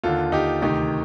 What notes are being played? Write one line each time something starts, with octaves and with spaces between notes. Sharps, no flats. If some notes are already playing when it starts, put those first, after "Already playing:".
D#2 D3 F4 A4
D#4 G4
D2 C3 D#3 D#4 G4